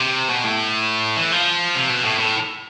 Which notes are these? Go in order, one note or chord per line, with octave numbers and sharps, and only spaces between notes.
C3
B2
A2
E3
F3
C3
B2
A2
A2